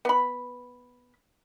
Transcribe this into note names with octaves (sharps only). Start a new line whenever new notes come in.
B3 B5